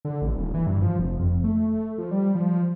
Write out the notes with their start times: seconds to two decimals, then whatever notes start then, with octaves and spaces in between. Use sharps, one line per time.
0.05 D3
0.22 A1
0.36 D#1
0.54 E3
0.67 G2
0.82 F3
0.99 F1
1.19 F2
1.44 A3
1.98 F3
2.11 G3
2.35 F3